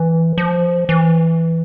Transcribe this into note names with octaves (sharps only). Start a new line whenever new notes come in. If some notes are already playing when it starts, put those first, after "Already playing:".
Already playing: E3
F3
E3